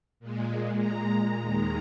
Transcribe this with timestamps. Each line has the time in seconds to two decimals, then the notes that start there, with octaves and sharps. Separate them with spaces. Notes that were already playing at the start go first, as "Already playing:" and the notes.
0.20 A#2 G#3
0.79 A#5
1.38 D#2 D#3 G#3 A#5